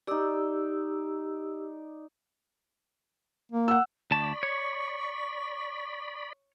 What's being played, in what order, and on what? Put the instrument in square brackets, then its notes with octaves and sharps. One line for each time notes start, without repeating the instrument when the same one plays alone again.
[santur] D#4 D5 [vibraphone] G4 E6
[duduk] A#3
[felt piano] F#5 E6
[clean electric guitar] D2 A5 [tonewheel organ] D5 B5 [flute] C#6
[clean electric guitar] C#5